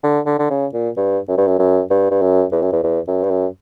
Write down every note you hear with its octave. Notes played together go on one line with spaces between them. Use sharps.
D3
D3
D3
C#3
A#2
G2
F#2
G2
F#2
F#2
G2
G2
F#2
E2
F#2
E2
E2
F#2
G2
F#2